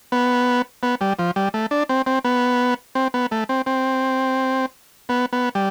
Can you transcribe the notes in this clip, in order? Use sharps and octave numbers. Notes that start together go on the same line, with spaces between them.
B3
B3
G3
F3
G3
A3
D4
C4
C4
B3
C4
B3
A3
C4
C4
B3
B3
G3